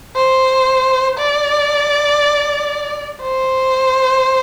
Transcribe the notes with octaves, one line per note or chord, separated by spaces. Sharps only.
C5
D5
C5